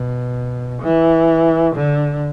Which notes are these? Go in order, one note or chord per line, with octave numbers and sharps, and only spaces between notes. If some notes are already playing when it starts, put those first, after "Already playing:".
Already playing: B2
E3
D3